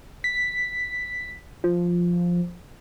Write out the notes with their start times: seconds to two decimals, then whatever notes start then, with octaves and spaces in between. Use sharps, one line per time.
0.24 B6
1.64 F3